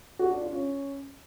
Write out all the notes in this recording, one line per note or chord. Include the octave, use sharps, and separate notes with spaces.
F#4
D4
F4
C#4